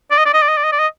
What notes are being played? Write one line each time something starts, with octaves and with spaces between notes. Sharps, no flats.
D5
D#5
D5
D#5
D5
D#5
D5
D#5
D5
D#5